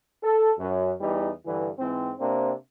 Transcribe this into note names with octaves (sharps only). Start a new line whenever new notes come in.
A4
F#2
E2 E3 G3 D#4
G2 D3 E3
G#2 E3 C4
C3 A#3 C4 D4